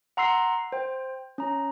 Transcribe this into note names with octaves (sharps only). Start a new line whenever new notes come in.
F#5 A#5 C6 E6 C7
C5 G5
C#4 A#5